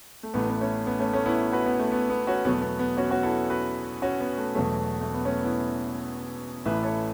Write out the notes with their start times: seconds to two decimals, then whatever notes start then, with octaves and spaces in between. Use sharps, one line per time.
0.23 A3
0.34 A1 A2 A3 B3
0.50 B3
0.61 A3 C#4
0.86 B3
0.99 A3 C#4
1.13 A3 C#4
1.26 B3 E4
1.52 F#4 B4
1.66 B3
1.79 A3
1.92 B3
2.10 B3
2.27 C#4 F#4
2.45 E2 B2 F#3 A3 B3
2.62 B3
2.79 B3
2.97 C#4 F#4
3.11 C#4 F#4
3.23 E4 A4
3.50 F#4 B4
4.02 C#4 F#4
4.20 B3
4.38 A3
4.55 E1 E2 B2 F#3 A3
5.01 A3
5.14 B3
5.25 A3 C#4
5.43 B3 E4
6.65 A1 A2 E3 A3 B4 E5
6.83 A4 C#5